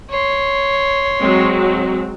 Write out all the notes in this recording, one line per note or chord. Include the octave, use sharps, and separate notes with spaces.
C#5 C6
F#3 G#3 C4